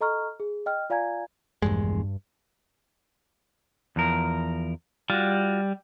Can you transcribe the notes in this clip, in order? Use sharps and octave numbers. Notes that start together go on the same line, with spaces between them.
A4 D#5 A#5 C#6 F6
G#4
D#5 G5 F6
F4 D5 F5 G#5 A#5 G#6
A#1 E2 G2 G#3
E2 F3 A#4
G3 F4 F#4